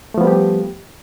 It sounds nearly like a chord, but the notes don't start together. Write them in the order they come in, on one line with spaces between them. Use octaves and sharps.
A3 F3 B3 G3 G4